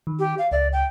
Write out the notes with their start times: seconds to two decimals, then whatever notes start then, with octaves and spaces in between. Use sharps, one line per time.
0.07 D#3
0.19 G4
0.38 F5
0.52 C#2 D5 E5
0.73 G5